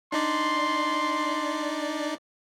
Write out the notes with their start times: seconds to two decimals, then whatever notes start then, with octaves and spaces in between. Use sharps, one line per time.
0.12 D4 D#4 D5 C6